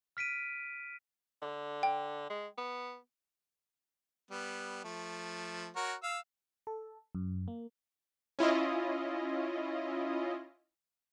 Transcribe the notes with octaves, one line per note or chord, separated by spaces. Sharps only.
F6 B6 D7 D#7
D3
G5
G#3
B3
G3 B3
F3 A3
F#4 A#4 C#5
F5 E6
A4
F#2
A#3
C#4 E4 F4 D#5